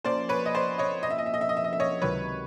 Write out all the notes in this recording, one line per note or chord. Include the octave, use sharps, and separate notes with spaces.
F3 A#3 C#4 C5 D5
B4 C#5
D#5
C5 D5
C#5 D#5
D#5
E5
D#5
E5
D#5
E5
D#5
E5
D#5
E5
C#5 D#5
C#2 C3 D#3 F#3 B4 C#5